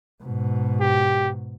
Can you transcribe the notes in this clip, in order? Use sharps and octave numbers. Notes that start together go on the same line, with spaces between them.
G#2 B2
G4